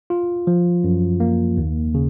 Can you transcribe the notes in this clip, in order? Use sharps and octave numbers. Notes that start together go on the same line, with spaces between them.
F4
F3
F#2
A#3
D#2
C#3